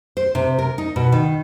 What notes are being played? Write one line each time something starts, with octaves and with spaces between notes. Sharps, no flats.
C5
C3
A#4
D#4
B2
D#3